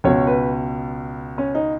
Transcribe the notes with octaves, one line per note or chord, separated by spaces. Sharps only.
C#2 B2 C#5
B4
C#4
D#4